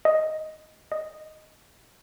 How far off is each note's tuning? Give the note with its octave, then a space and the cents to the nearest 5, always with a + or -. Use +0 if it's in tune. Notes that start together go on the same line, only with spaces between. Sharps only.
D#5 +5
D#5 -5